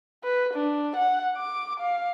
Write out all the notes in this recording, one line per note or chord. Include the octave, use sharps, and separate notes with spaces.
B4
D4
F#5
D6
F5